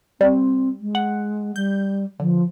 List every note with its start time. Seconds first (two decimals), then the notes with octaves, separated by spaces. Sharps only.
0.21 G3 C4
0.80 G#3
0.95 F#5
1.56 G3 G6
2.20 D3 F3